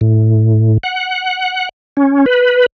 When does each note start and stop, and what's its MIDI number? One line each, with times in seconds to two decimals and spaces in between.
0.01 0.78 45
0.83 1.69 78
1.97 2.25 61
2.26 2.66 71